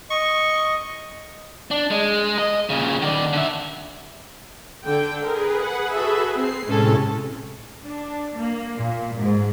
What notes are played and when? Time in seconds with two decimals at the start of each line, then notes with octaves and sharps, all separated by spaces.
0.10 D#5 C#6
1.71 D4
1.91 G#3
2.38 D#5
2.70 A#2 C#3
3.02 D#3 D5
3.33 D3 E5
4.86 D3 G5
5.23 G#4 A#4 B4
5.63 F#5
5.93 F#4 A4 E5
6.34 C4 C7
6.66 A2 C3 G#3 C#4 A4 A5
7.85 D4
8.37 A#3
8.77 A#2
9.18 G#2